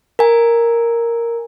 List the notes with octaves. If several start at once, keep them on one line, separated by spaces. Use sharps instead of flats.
A#4 G#5